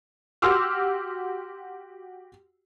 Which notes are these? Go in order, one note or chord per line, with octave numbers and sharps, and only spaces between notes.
F#4 G4 C6 D6 E6 F6